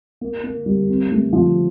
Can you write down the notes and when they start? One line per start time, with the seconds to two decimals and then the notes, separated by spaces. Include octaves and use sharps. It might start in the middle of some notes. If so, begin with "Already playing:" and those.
0.21 A#3
0.44 A#3
0.66 G3
0.89 C4
1.12 A3
1.33 F3